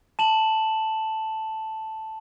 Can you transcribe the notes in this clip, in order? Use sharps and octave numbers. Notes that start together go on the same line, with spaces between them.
A5 E7 F#7